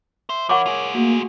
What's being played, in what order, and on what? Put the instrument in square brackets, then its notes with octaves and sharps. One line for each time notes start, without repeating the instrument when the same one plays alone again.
[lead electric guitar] C5 [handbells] E5
[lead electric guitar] E3 [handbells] A#4 C#5 [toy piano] F#5 C#6 D6
[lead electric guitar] F4 G#4
[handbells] A3 F#4 G#5 [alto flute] A#3